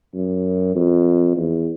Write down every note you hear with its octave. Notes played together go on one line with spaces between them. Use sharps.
F#2
F2
E2